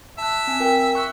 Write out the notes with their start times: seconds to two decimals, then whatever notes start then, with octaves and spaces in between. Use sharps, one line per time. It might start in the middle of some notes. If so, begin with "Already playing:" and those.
0.18 E5 A5 F#6
0.47 C4 G#5
0.60 F4 A#4 G5
0.95 C#6 F#6